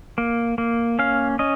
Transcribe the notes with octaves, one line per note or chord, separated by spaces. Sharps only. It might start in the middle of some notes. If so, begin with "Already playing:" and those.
A#3
A#3
C#4 F5
C#4 D#5